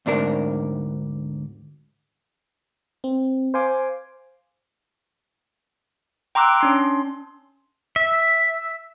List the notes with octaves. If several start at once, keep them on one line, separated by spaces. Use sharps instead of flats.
D2 G#2 D4 A#4
C4
C5 F5 G#5 C6 D6
G5 A#5 C6 D6 E6 F#6
C#4 D4 C6
E5